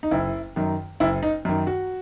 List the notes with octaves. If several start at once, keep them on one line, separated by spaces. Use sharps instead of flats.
D#4
F#1 E4
F#2 D#3
F#1 E4
D#4
F#2 D#3
F#4